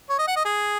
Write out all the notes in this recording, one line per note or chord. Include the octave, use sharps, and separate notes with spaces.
C#5
D#5
F#5
D#5
G#4